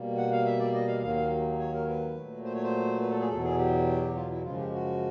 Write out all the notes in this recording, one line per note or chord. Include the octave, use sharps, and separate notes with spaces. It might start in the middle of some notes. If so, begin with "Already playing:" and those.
Already playing: B2 G3 A#3
F#5
F5
E5
D5
D#5
F5
D#2 D#3 F#3 A#3 F5
F5
C#5
A#4
B4
A#2 F#3 A3
C5
C#5
C5
B4
A4
G#4
E2 B2 F#3 A4
G#4
G4
F4
E4
F#2 C#3 F3 G#3 F4
G4
F#4